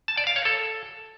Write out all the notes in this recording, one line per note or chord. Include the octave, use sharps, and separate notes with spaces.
A5
D5
F5
C#5
A4